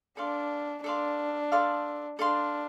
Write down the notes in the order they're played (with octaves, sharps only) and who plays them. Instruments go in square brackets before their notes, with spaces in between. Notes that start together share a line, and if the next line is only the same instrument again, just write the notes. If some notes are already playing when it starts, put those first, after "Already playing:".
[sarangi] D4 [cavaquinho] A4 D5 F5 C6
[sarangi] D4 [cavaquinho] A4 D5 F5 C6
[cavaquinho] A4 D5 F5 C6
[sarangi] D4 [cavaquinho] A4 D5 F5 C6